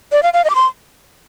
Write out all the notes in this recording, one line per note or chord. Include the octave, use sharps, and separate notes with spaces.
D5
F5
F5
D#5
D6
C6